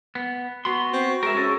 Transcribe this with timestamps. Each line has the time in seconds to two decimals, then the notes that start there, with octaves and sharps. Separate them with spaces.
0.15 B3
0.65 B3 F#4 B5 C6
0.93 C4 F#4
1.23 G#3 A#4 E5
1.35 C#4 A4